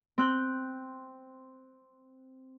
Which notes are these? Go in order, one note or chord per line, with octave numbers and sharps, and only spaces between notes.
C4 F#6 G6